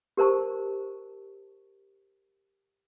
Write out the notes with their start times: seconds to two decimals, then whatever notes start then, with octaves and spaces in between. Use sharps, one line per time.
0.17 G4 A#4 C5 A5 C#6